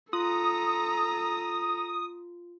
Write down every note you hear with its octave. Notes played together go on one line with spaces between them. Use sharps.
F4 A4 A#5 D#6